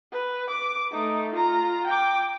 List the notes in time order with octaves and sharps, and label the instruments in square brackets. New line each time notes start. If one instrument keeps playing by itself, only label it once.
[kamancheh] B4
D6
A3 D#4
F4 A#5
G5 D6